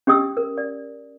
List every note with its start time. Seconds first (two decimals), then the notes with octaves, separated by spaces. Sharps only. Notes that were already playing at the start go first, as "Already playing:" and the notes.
0.07 C#4 G4 D#5 D#6 E6
0.37 A#4
0.58 D5